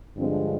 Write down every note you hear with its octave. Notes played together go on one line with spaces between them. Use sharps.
G2 D3 F3 G#3 C4